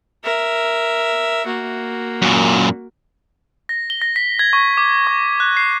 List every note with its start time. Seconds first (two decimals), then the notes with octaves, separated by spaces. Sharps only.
0.24 A#4 E5
1.46 A#3 F#4
2.22 F#2 A#2
3.69 A#6
3.90 G7
4.02 A#6
4.16 B6
4.39 G#6
4.53 C#6
4.77 D6
5.07 C#6
5.40 F#6
5.57 C7